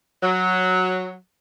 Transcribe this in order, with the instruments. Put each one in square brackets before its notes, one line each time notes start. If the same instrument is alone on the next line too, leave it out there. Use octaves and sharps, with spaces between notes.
[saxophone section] F#3